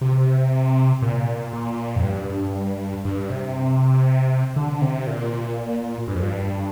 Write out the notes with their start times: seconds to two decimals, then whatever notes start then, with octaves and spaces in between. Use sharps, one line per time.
0.01 C3
1.02 A#2
1.53 A#2
1.96 F2
2.04 G2
3.05 G2
3.30 C3
4.56 D3
4.81 C3
5.07 A#2
6.07 G2
6.15 F2
6.22 G2